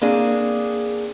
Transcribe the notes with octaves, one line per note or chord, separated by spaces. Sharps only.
A#3 C4 D4 G#4